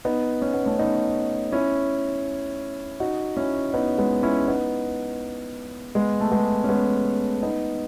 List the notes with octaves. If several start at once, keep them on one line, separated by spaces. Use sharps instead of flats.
B3 D#4
C#4
B3
A3 C#4
B3 D#4
C#4 E4
D#4 F#4
C#4 E4
B3 D#4
G#3 B3
C#4 E4
B3 D#4
G#3 B3
A3
G#3 B3
C#4
G#3 B3
B3 D#4